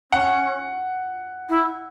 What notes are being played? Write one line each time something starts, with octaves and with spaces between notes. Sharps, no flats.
C#4 F#5
E4